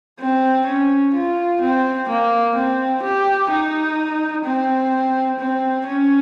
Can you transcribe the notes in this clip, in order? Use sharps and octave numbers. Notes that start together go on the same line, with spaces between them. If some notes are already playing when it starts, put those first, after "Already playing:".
C4
C#4
F4
C4
A#3
C4
G4
D#4
C4
C4
C#4